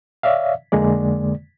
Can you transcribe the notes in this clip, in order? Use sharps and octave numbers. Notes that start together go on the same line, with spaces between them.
C#5 D5 E5 F5
F2 D3 G#3 A#3 D5